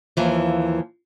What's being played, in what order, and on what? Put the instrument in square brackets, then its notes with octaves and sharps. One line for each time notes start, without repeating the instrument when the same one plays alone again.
[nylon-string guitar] D#2 E3 F3